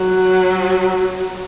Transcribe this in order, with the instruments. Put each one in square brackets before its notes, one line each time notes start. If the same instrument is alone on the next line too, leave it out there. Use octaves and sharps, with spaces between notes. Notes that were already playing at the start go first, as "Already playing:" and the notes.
Already playing: [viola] F#3